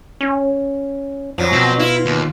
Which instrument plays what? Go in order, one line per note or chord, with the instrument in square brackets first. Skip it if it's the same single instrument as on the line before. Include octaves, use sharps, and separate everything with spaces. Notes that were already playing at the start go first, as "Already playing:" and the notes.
[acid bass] C#4
[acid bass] F2 [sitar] F3 F#3
[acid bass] B2 [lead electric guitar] C4
[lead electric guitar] E4 [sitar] F4
[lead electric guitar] D#2